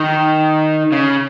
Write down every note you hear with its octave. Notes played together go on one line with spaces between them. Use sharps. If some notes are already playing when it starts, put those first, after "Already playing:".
Already playing: D#3
C#3